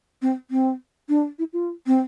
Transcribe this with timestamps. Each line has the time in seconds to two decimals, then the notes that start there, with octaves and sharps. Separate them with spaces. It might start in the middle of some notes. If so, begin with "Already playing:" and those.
0.22 C4
0.51 C4
1.09 D4
1.39 E4
1.53 F4
1.87 C4